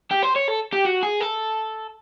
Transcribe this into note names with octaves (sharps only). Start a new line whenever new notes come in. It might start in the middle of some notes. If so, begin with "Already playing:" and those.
G4
C5
C#5
A4
G4
F#4
G#4
A4